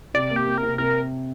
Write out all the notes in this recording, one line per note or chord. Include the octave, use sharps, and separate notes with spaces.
C3 D5
A#3
G4
A#3
A#4
C3
C3 A#4